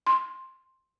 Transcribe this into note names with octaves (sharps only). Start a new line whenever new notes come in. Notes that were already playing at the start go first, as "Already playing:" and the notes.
C6